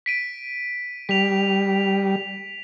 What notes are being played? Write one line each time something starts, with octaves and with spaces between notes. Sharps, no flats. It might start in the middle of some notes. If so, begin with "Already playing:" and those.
B6 D7 D#7
G3 B6 F7